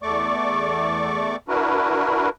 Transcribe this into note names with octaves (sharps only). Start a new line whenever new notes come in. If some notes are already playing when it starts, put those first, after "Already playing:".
E2 A3 D5 C#6 D6
D4 E4 F#4 A#4 B4